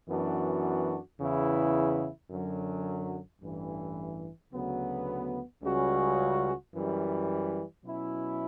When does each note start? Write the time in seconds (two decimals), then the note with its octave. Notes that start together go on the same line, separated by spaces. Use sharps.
0.09 F#2 E3 B3 D4 F#4
1.19 E2 C#3 E3 B3 E4
2.30 F#2 D3 F#3
3.41 A1 G2 E3
4.52 D2 C#3 F#3 B3
5.62 C#2 C#3 G3 C#4 F#4
6.73 F#2 E3 G3
7.84 B2 F#3 C#4 E4